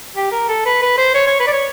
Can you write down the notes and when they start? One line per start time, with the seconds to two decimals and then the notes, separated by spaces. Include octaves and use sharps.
0.15 G4
0.32 A#4
0.48 A4
0.66 B4
0.82 B4
0.98 C5
1.14 C#5
1.27 C#5
1.40 B4
1.47 D5
1.52 C#5